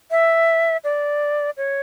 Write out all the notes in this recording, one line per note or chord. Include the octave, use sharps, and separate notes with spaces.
E5
D5
C#5